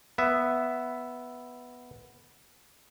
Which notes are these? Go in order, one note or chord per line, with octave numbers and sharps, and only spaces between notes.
B3 E5